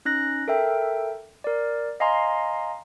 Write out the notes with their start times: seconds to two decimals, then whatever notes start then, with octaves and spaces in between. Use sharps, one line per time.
0.05 C#4 D#4 F#6 A#6
0.48 A4 A#4 E5 G5
1.44 A#4 D5
2.00 D#5 F5 G#5 A#5 C6